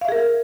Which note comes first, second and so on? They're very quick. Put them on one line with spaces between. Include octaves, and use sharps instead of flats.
F5 E5 G#4 A#4